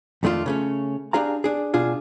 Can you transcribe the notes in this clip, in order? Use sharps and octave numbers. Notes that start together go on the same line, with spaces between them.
F2 D#3 A3 D4 F4
C#3 A3 C#4
D4 G4 G#4 F5 A#5
D4 G#4
B2 D4 F4 G#4